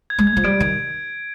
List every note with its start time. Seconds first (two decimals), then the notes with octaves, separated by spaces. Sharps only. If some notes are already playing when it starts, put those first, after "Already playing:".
0.10 G#6
0.18 G#3
0.27 G#6
0.37 F3
0.44 G3 D7
0.60 D#3 G#6